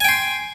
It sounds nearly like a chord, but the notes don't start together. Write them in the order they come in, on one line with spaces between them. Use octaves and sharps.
G#5 G5 C6